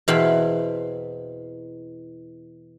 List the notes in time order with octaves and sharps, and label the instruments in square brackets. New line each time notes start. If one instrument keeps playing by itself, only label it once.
[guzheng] E2 B2 E3 C4 F5 B5